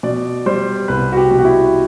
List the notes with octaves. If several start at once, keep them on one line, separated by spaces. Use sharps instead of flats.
B2 D5
G3 C5
C2 B4
F#4
G4
B2
F#4
E4